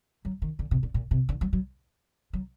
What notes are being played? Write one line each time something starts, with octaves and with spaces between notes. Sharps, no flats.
F#3
D#3
D3
C3
A#2
A#2
C3
D3
F#3
F#3
F#3